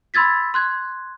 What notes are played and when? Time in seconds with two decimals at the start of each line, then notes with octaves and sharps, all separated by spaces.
0.14 B5 C6 E6 G#6 A6 B6
0.54 C6 F#6 G#6